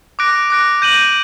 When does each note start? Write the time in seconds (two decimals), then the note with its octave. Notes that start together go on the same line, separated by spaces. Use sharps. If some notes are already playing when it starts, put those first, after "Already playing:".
0.19 D6 F#6 A#6 D7
0.50 D6 F#6 A#6 D7
0.82 G6 A#6 D#7 F#7